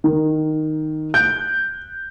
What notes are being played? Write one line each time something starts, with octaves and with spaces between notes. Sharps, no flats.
D#3
F#6 G6 D7